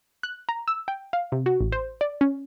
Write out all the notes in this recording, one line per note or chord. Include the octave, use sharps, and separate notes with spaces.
F#6
A#5
E6
G5
F5
C3
F#4
A1
C5
D5
C#4